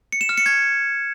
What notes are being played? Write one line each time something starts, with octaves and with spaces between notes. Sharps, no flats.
C#7
E7
F6
C#7
G#6